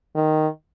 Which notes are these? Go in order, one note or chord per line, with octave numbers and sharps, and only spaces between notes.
D#3